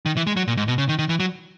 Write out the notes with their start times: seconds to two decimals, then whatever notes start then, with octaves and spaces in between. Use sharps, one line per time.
0.06 D#3
0.17 E3
0.27 G#3
0.37 F#3
0.48 A#2
0.57 G#2
0.68 B2
0.78 C#3
0.89 D#3
0.99 D#3
1.09 E3
1.20 F#3